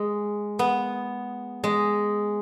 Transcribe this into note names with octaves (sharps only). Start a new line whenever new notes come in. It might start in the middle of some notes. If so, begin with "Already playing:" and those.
Already playing: G#3
B3
G#3